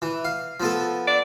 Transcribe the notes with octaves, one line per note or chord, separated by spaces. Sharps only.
E3
F5
F3 B3 A4
D5